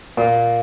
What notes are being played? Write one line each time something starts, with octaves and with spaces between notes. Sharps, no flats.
A#2